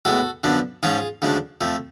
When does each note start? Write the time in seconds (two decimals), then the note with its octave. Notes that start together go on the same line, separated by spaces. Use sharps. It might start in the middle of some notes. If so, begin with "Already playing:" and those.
0.05 A2 G#3 B3 F#4 A4
0.44 F#2 D3 F3 B3 D4
0.83 G#2 F3 G#3 C#4 F4 G#4
1.22 D2 C#3 F3 G#3 D4
1.61 F2 F3 A3